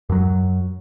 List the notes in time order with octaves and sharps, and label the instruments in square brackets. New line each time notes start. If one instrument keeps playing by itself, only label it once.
[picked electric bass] F#2 F#3